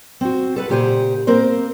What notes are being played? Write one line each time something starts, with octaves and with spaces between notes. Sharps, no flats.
C4 F#4
A4 B4 F#5
A#2 C#3 G4 C5 F#5 G#5
A#3 C4 A#4 C5